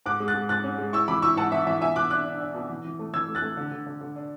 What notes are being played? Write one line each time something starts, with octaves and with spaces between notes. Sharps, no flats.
G#2 D6 F#6
G#3
F#6 A6
G#3
G#2 F#6 A6
C#4
G#3
E4 C#6 E6
E3 B5 D6
E4 C#6 E6
G#2 F#5 A5
E3 E5
E3 E5
B2 E5 G#5
B2 D6 F#6
D4 D6 F#6
D4
D4
B2
E3
E3
A3
E3 E6 G#6
A3
F#6 A6
A3
D3
D3
D3
D3
D4